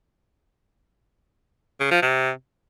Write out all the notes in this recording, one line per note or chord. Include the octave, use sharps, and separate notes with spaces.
C#3
F3
C3